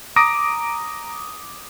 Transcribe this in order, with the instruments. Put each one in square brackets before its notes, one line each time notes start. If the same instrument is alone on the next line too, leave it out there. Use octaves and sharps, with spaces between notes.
[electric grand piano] A#5 D6 D#6 A#6 D7